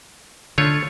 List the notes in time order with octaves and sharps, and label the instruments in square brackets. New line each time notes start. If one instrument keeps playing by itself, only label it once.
[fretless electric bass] D3 [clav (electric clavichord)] A3 F4 C#5